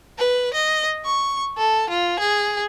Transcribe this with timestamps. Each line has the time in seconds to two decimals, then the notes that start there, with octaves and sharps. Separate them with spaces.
0.18 B4
0.54 D#5
1.05 C#6
1.57 A4
1.90 F4
2.19 G#4